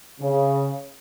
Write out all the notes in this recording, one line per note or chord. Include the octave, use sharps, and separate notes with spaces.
C#3